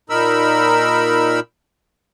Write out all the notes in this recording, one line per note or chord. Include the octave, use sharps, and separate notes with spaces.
A#2 D#4 A#4 B5 E6